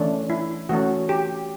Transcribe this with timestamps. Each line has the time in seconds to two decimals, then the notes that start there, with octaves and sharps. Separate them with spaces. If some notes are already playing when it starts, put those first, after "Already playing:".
Already playing: E3 A3 C#4 D4
0.30 E4
0.69 E3 A3 C#4 F#4
1.09 G4